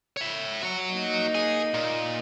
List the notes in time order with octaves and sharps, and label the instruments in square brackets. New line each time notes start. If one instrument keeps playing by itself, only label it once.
[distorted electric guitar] C#5 E5
F#4 C#5
[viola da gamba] A#3 D#4
[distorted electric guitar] G#4
A#2